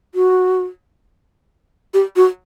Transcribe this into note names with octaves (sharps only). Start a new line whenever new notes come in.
F#4
G4
F#4